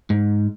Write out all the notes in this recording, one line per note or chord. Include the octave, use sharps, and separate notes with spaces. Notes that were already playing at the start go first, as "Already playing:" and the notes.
G#2